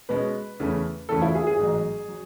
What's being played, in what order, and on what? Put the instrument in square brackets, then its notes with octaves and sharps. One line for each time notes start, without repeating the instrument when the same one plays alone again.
[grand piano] B2 G#3 C#4 [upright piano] B4
[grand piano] E2 C#3 E3 A3 C#4
[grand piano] E2 C#3 E3 A3 C#4 [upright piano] A4
[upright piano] E4
G#4
G#4
[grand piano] A1 G#2 F#3
F#3